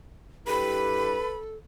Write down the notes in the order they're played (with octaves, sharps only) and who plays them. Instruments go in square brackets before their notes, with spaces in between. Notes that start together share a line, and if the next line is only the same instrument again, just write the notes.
[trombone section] G2 E4 G4 [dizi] A4 [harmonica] B4 [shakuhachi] B5